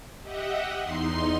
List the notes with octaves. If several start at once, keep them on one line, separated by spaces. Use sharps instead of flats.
G4 D#5 E5 F#5
E2 D#4 C6 C7